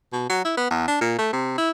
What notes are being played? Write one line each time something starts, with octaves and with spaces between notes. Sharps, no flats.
B2
F#3
E4
B3
E2
D4
A#2
A3
C3
E4